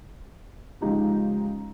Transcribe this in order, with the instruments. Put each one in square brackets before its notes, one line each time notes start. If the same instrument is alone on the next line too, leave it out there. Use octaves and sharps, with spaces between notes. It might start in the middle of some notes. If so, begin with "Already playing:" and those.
[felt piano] C#3 F3 G#3 D#4 G4